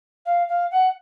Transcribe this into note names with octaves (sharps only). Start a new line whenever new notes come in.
F5
F5
F#5